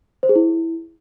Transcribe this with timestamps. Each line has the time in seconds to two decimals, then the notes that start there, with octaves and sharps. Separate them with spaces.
0.23 C5
0.29 G#4
0.35 E4